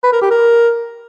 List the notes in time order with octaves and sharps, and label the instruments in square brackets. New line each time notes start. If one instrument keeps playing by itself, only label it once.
[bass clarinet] B4
A#4
G4
A#4